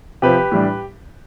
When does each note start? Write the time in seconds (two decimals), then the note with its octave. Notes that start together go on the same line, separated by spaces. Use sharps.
0.22 C3 F3 C4 G4 B4
0.52 A2 E3 G3 D4